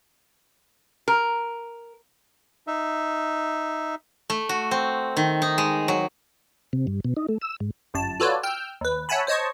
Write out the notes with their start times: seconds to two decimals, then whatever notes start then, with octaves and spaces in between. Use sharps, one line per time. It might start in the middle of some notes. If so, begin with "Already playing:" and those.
1.08 A#4
2.67 D#4 E5
4.30 A3
4.49 F#4
4.71 C4
5.17 D#3
5.42 D#4
5.58 G#3
5.88 F#3
6.73 C3
6.87 G2
7.05 B2
7.17 D#4
7.29 A3
7.41 E6
7.60 G#2
7.94 G1 F#2 A5
8.20 F4 F#4 A4 B4 C#5 D5
8.43 G5 E6 F6 G6
8.81 D#2 B4
9.09 C#5 E5 F#5 G#5 A5 B5
9.27 C5 C#5 D#5 A5 C#6